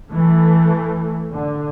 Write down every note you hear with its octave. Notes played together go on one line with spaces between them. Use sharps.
E3 A3
D3